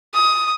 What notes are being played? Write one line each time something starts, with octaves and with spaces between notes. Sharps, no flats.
D#6